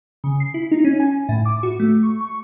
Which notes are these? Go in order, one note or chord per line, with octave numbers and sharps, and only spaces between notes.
C#3
C7
E4
D#4
C#4
G#5
A2
D6
F#4
A3
C#6
C#6